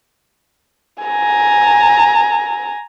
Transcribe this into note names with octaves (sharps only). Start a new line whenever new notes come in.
G#5 A#5